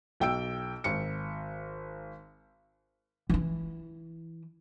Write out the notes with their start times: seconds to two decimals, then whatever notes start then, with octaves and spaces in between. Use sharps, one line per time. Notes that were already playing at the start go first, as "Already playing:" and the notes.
0.20 B1 G5 E6 D7
0.84 G#1 C#7
3.29 E3 E4